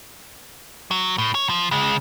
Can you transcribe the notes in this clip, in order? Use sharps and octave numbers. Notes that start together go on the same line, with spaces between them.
F#3
A2
C#5
F3
C#3 G#3